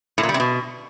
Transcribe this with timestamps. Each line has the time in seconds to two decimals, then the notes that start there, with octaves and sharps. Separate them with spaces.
0.18 A2
0.23 A#2
0.29 G3
0.34 C3
0.40 B2